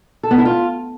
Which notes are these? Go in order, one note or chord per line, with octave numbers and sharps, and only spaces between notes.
A4
B3
E4
F4